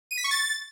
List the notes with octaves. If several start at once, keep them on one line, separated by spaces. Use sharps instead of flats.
D#7
B6
C#6
A6